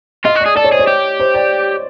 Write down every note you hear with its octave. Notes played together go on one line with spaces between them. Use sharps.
F4 D#5
F#4
D5
G#4
A4 D5
C#5
G#4 C5
C#5
G4
C5
D5